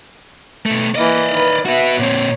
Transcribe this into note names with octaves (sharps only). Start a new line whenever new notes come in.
B2 A3
E3 A#3 D5 D#5
D#3 B4
F#4 B4 E5 F#5
A#2 C4 C#5